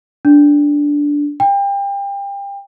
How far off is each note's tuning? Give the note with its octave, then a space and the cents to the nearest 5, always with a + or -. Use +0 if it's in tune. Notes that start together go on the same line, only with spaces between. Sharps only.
D4 -10
G5 +30